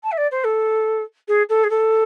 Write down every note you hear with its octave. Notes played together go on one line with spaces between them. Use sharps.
A5
E5
D5
C5
A4
G#4
A4
G#4
A4